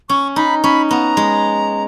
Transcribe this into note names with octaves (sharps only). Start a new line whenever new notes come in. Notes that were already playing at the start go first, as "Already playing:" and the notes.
C#4 C#6
D#4 B5
C#4 B5
B3 A#5
G#3